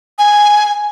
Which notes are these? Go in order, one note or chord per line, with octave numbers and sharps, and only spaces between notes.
G#5